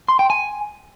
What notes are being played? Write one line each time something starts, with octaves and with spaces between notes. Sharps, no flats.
C6
G5
G#5